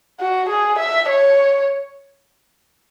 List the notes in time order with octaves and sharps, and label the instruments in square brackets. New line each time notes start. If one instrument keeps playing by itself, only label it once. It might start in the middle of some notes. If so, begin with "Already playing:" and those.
[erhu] F#4
G#4
E5
C#5